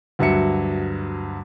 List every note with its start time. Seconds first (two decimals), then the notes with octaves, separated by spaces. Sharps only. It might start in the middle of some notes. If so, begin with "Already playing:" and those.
0.19 D2 G2 F#3 E5 C#7